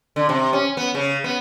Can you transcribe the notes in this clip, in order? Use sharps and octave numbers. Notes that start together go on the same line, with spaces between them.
D3
C3
C#4
B3
C#3
B3